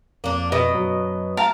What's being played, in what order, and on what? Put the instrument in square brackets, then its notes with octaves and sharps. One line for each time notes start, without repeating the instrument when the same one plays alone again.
[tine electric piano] F2 [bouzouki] A#3 D4
[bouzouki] B2 [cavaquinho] D#5
[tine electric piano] F#2 F#3
[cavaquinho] A#4 F5 A5